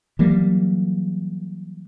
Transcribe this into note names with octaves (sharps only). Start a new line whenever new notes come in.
E3 F#3 G3 A#3